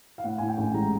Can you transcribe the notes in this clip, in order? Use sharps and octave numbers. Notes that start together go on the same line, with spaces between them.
F5
A2 F#5
A2 G#5
G5
A1
G#3 A#5